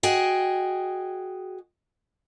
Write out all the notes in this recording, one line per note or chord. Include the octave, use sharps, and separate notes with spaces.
F#4 G#4 D#5 G5